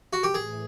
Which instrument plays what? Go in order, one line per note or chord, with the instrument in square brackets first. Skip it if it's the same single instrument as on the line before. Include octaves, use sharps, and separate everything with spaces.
[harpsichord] F#4
G4
[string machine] A2 E3 [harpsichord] G#4